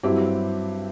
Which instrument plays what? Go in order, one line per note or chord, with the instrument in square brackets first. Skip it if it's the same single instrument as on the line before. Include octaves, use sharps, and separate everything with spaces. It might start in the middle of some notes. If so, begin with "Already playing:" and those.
[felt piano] G2 F#3 C4 E4 G4